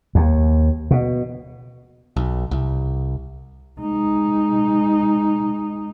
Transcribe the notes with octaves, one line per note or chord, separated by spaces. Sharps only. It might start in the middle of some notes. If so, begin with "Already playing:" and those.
D#2
B2
B1
C2
G#3 D#4